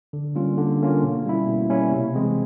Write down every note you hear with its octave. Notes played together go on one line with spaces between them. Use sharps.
D3
G3 A#3 C#4 F4
D3
G3 A#3 C#4 F4
B2
G3 A#3 C#4 E4
B2
G3 A#3 C#4 E4
C3
E3 G#3 C4